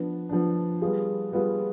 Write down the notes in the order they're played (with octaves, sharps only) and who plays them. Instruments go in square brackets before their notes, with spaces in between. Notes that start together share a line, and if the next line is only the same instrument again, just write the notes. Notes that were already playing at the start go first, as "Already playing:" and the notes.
Already playing: [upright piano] F3 B3 D4
F3 B3 D4
G3 B3 F4 G#4
G3 B3 F4 G#4